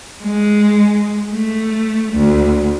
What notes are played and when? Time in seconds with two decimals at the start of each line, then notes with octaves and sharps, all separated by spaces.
0.23 G#3
1.31 A3
2.13 D2